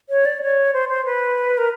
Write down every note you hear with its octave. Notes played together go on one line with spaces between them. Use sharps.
C#5
D5
C#5
C5
C5
B4
A#4